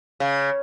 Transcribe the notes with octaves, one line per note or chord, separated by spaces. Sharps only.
C#3